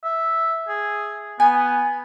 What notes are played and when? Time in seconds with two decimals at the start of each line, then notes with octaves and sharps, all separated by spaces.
0.04 E5
0.68 G#4
1.40 B3 G#5